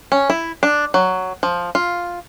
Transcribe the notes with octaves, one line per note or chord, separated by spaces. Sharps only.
C#4
E4
D4
F#3
F3
F4